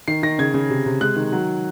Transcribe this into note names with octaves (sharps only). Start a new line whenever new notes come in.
D#3 C7
D#3 A#6
C#3 G#6
C#3
C3
C3
G#3 F#6
D#3
F#3